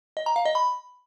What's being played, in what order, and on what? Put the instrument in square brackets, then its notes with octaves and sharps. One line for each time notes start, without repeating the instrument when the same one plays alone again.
[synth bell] D#5
A#5
F5
D#5
B5